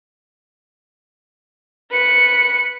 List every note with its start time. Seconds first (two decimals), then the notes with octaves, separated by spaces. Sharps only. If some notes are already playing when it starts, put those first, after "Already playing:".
1.92 B4 C#7